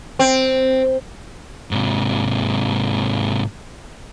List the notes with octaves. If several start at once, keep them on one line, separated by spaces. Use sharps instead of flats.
C4
G#2 C3